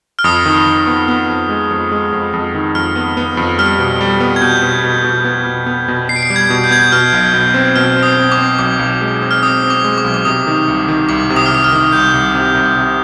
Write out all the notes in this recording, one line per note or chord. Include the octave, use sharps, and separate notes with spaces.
F6
F2 D#6
D#3
D#3
B3
B3
F2
G#3
F2
G#3
F2
F2
D#3
F2 F6
B3
B3
F2
G3 F6
B2
G3
B3
G#6
B2 G6
B2
B2
B2
B3
B2
B3
B2
B2 C7
D7
C7
G3
G#6
B2
G6
B3 G#6
G6
B2 F6
B1
B2
C4
B2 F6
C4
D#6
C4
D6
C4
B1 D6
B1
G#3
C4
F6
C4 D#6
C4
D6
G#3
D6
B1
D6
C3 D#6
D#3
C2
D#3
C2 D6
C3
D#6
F6
C3 D#6
F6
D#3
C2 G6
C2
C3
C2
C3